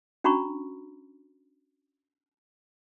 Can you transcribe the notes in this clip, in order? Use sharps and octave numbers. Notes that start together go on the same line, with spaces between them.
C#4 D4 F#4 A#5 B5 C#6